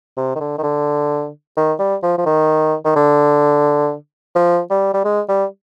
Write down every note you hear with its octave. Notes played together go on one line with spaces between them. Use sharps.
C3
D#3
D3
D#3
D3
D#3
G3
F3
F3
D#3
D#3
D3
F3
G3
G3
G#3
G3